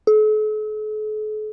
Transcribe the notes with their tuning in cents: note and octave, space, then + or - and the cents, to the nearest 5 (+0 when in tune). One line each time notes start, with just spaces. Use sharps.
A4 -45